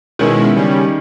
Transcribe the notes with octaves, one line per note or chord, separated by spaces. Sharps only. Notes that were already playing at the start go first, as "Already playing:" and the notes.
B2 D#3 G#3 C#4 E4
C#3 G3 C#4